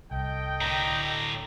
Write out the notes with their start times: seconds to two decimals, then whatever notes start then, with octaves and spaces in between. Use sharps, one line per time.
0.11 C2 A4 D#5 G5
0.61 A2 D3 A#5